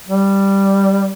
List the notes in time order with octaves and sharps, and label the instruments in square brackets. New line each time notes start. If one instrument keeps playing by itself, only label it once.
[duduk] G3